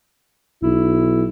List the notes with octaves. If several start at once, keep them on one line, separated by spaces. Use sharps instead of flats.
B1 E4